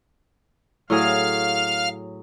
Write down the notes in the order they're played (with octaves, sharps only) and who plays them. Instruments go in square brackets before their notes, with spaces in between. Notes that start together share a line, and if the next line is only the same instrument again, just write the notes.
[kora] A2 F#3 G#4 [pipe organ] F5 F6